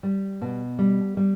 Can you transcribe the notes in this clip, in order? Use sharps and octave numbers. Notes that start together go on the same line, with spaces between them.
G3
B2
G3
G3